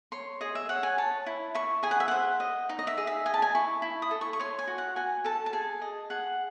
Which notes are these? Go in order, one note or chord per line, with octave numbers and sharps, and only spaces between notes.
C#5 C6
G#4 D#5
E5
C#5 F#5
G#5
C#5 A5
E4
E4 C#6
G#4 G#5
F#5
E5
C5 F#5
D#5
D#4
D#5
E5
G#4
E5
D#5 G#5
A5
G#5
E4 C#6
E4
D#6
A4
C#6
C#6
C#5 C6
G#5
F#4
F#5
F#4 G#5
A4 A5
A5
G#4 G#5
D#5
G#4 F#5